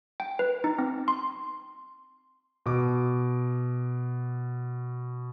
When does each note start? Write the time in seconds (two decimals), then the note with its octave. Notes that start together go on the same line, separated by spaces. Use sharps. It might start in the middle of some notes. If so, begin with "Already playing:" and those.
0.20 G5
0.39 B4
0.64 D#4
0.79 C4
1.08 C6
2.66 B2 D6